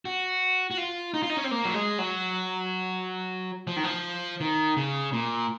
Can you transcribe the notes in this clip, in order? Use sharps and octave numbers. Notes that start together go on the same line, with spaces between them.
F#4
F#4
F4
D#4
F4
D#4
C#4
C4
A#3
F#3
G#3
F#3
F3
D#3
F3
D#3
C#3
A#2